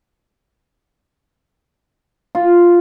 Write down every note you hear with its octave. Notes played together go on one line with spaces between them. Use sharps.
F4